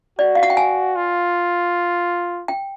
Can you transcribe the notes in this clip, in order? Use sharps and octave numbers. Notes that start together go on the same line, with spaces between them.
F#4 D5
F5
F#5
G5
G#5
F4
G5